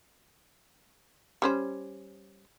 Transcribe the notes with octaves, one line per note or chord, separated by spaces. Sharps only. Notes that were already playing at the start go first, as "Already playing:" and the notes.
G3 C#4 C5